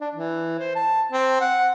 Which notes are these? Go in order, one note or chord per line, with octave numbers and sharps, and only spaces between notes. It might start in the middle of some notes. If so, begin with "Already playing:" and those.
D4
E3
C5
A5
C4
F#5